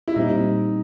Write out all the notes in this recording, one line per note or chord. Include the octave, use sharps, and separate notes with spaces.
E4
A#2 G3 C4 D#4